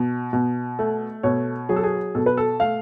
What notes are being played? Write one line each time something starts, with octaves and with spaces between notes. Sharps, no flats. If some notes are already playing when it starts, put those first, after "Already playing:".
Already playing: B2
B2
A3
B2 C#5
F#3 G#4
A4
G#4
B2 A4
B4
A4
A3 F5